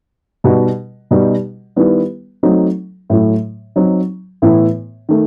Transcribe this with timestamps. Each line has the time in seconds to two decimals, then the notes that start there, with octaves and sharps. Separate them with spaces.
0.44 B2 G3 D#4 F#4
1.11 B2 G3 D#4 F#4
1.76 D#3 G3 B3 E4
2.43 F#3 A3 C4 D#4 F#4
3.10 A2 F#3 A3 E4
3.76 F#3 C4 D#4
4.42 A2 E3 B3 E4
5.09 D#3 A3